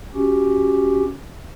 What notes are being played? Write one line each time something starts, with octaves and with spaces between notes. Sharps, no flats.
C#4 F#4 G4